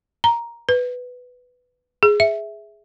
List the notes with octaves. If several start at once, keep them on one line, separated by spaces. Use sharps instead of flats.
A#5
B4
G#4
E5